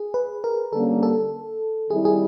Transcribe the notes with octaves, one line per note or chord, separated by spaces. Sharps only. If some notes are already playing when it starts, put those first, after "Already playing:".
Already playing: G#4
B4
A#4
D3 G3 A#3 C#4 A4
A4
D#3 G3 C4 E4 G#4
G#4